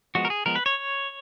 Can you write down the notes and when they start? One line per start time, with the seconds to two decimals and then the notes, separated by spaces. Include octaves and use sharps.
0.15 F3 G#3 B3 F#4
0.25 A#4
0.30 G#4
0.46 F3 G#3 B3 A#4
0.55 B4
0.66 C#5